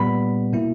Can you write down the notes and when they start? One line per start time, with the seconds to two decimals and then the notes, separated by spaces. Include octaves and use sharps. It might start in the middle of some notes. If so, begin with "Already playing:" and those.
Already playing: A#2 G3 B3 B5
0.53 B2 A#3 E4